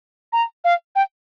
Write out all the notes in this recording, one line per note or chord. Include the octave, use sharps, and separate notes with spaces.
A#5
F5
G5